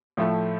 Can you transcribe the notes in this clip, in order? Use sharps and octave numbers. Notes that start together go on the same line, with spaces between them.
A2 F3 A3